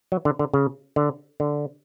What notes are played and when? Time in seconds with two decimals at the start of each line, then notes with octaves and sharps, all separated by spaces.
0.12 F#3
0.25 D3
0.39 D3
0.54 C#3
0.96 D3
1.40 D3